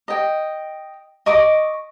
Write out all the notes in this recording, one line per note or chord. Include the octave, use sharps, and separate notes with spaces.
D#5 G5
D#5 C#6 D6